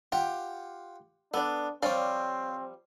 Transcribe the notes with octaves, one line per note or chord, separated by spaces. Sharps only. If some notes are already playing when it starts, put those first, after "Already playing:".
F4 G4 F#5 G5
B3 D4 A4 D5
F3 G3 C4 C#5 D5 F5